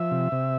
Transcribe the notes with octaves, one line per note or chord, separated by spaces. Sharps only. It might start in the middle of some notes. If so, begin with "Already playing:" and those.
Already playing: F3 E5
C3
C3